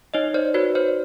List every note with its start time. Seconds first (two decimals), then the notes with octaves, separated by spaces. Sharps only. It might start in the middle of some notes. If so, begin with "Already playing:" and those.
0.14 D#4 C#5 D#5
0.34 C5 D5
0.54 F#4 B4 C#5
0.75 C5 D5